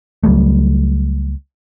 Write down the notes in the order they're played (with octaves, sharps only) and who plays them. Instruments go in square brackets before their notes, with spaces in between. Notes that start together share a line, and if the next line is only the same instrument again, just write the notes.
[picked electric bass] C#2 F#3 G3 A3